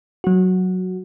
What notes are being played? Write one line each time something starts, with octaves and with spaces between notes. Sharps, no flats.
F#3 F#4